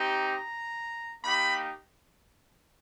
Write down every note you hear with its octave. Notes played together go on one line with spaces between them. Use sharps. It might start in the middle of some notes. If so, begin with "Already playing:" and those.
Already playing: C4 D#4 G4
A#5
A#3 D#4 G4 B5